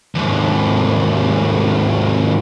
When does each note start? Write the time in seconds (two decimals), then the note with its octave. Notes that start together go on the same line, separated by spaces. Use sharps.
0.15 D#2 G#2